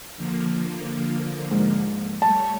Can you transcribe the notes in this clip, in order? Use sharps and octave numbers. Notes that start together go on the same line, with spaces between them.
D3 F3 A#3
G#2
G3 A3 C#5 A5